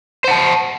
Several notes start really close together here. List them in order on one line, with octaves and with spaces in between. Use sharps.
C5 F#5 A5